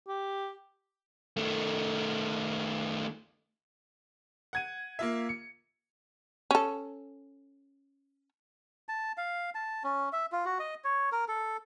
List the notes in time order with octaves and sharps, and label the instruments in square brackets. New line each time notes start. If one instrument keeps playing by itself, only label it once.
[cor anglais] G4
[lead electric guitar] D#3 A3
[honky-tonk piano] F#5 G#6 D#7
A#3 F4 E5
C#7
[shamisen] C#4 A4
[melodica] A5
F5
A5
C#4
E5
F4
F#4
D#5
C#5
A#4
A4